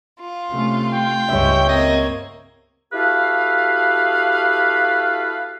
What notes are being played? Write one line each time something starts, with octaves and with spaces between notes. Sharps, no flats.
F4
C3 A3 C#4
G5
C#2 G2 G3 G#3 C#5 E5
A#3 C4 D#5 G#6
E4 F#4 G4 A4 B4 F5